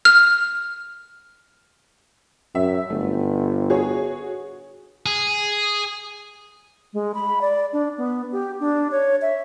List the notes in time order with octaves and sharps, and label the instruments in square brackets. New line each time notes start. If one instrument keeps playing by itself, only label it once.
[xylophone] F6
[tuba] F#2 [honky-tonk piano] E5
[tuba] G1 [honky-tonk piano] A3
[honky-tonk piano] F#4 G#4 C#5
[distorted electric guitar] G#4
[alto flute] G#3
B5
D5
D4
B3
G4
D4
C#5
E5